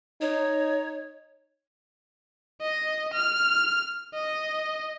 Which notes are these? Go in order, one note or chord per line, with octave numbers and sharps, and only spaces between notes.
D#4 C#5
D#5
F6
D#5